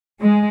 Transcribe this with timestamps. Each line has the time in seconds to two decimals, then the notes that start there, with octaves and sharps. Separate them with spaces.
0.21 G#3